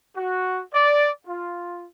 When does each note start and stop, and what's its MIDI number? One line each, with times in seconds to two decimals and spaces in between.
0.16 0.61 66
0.74 1.10 74
1.27 1.85 65